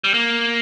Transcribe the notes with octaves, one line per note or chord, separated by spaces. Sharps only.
G3
A#3